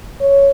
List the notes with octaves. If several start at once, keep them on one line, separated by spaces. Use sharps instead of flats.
C#5